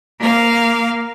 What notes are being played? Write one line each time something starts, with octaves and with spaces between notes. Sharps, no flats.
A#3 F5